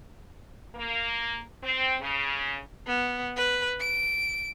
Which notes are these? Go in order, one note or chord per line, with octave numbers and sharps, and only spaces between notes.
A#3
C4
C#3
B3
B4
D7